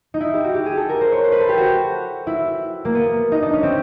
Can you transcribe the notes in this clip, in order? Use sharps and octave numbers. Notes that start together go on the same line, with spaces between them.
D#4
E4
G4
F#4
G4
G#4
A4
A#4
C5
C#5
C5
B4
A4
G4
F#4
E4
A#3
B3
D#4
D4
C#4
C4